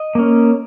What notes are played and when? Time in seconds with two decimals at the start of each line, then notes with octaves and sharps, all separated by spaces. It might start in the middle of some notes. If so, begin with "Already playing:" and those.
Already playing: D#5
0.15 A#3 C#4